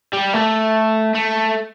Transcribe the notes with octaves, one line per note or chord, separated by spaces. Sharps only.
G3
A3
A3